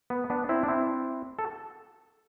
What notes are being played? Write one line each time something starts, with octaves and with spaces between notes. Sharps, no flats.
B3
B3 D4
C4 E4
D4
C4 E4
A4